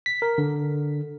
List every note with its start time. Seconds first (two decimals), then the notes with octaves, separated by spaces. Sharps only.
0.06 B6
0.22 A#4
0.38 D3